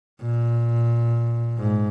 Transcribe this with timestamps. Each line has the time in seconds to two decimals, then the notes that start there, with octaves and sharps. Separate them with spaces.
0.22 A#2
1.59 G#2